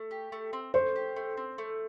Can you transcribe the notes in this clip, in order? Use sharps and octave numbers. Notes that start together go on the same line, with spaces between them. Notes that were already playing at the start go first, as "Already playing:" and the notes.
Already playing: A3
G4
A3
C4
A3 C5
G4
A3
C4
A3